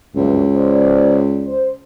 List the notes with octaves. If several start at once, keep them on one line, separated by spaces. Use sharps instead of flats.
F#1 C#2 G2 E3
C5 D5
C5